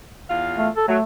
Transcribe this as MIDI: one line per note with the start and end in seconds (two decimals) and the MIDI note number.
0.30 0.69 40
0.30 0.69 65
0.30 0.69 77
0.58 0.69 57
0.76 0.87 69
0.88 0.98 54
0.88 1.03 57